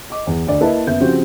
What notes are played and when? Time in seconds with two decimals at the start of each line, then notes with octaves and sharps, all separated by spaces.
0.10 D#5 D6
0.27 E2
0.47 D2 D5
0.60 A#3 E4 B4 D#5 E5 A5
0.87 F#1 B3 E5 G6
1.00 C#3 F3 C4 F#4 G4